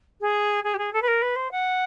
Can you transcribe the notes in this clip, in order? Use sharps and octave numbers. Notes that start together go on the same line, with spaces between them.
G#4
G#4
G4
G#4
A4
B4
A#4
B4
C5
F#5